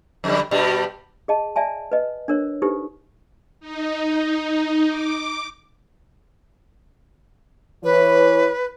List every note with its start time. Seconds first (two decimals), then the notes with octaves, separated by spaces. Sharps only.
0.24 F2 D3 G3
0.51 G2 B2 G3
1.28 G#4 D#5 A5
1.56 D5 E5 G#5 A5
1.92 B4 D#5
2.28 D4 A#4 C#5
2.62 D#4 E4 G4 A4 B4 C5
3.60 D#4
4.88 D6
7.84 E3 B4 C#5